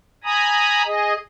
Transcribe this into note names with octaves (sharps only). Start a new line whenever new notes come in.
G#5 A#5 B5 D#6
G#4 D#5